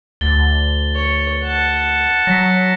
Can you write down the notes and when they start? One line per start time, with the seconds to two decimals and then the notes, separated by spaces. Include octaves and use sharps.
0.21 D2 A6 G7
0.94 C#5
1.43 F#5 A5
2.27 F#3 A#6 B6